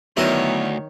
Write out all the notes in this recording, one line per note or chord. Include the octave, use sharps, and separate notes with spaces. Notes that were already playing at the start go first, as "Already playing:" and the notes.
D2 D#3 F#3 B3 E4 A#4 C#5